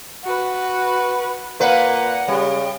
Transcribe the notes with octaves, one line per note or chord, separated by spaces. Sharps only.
F#4 B4
A#2 A#3 B4 F#5
C#3 G3